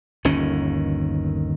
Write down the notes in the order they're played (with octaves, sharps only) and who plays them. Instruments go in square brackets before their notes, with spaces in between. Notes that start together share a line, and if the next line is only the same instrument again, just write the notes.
[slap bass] G1 D#2 D#3 C#4